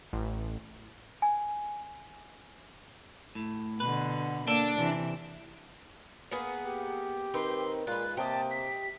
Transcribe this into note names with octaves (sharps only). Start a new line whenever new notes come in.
A1
G#5
A2
B2 D3 B4
A#3 D4 A4
C3 E3
A#3 B3 G#4 F#5
G4
D#3 C4 D#4 B4 C6
A#2 G#3 F4 B4 F#6
C3 A#3 G4 D#5 A5
B6